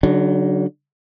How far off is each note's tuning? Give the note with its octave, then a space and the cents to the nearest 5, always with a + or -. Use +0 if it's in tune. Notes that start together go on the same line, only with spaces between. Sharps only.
D3 -40 F#3 +10 D4 +45